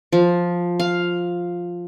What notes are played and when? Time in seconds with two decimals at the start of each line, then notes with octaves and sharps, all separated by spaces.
0.12 F3
0.80 F5